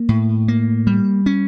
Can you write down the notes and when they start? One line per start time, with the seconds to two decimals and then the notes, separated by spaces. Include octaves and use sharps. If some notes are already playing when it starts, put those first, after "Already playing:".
Already playing: A#3
0.09 A2
0.48 A#3
0.87 G3
1.26 C#4